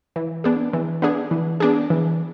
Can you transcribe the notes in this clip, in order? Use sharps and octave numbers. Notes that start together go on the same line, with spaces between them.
E3
B3 D4 G#4
E3
B3 D4 G#4
E3
B3 D4 G#4
E3